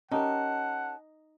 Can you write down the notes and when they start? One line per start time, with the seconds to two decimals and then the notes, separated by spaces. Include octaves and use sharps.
0.12 C#4 D#4 G4 A#4 F#5 A5